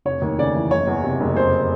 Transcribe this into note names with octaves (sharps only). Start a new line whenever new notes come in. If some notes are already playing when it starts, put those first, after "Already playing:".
F1 C#5
D#2
C#3 D5
E3
F#1 C#5
E2
C3
F#1
F1 C5